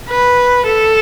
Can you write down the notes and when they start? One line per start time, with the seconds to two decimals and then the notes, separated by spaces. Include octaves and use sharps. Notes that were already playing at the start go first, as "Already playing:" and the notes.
0.09 B4
0.66 A4